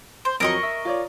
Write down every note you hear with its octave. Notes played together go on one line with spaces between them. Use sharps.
C5
F2 F#3 A#4 D#5 C#6
E5
F4 C#5 D5